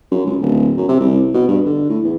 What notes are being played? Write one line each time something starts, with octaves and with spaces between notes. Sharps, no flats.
F#2
C#2
D1
F#2
C3
C2
B2
G2
D3
A2
E2